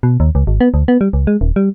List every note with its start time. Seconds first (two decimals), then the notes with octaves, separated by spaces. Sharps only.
0.03 B2
0.20 D#2
0.35 C#2
0.47 G#1
0.61 B3
0.74 D2
0.88 B3
1.01 G3
1.13 C#2
1.27 G#3
1.41 D#1
1.56 G3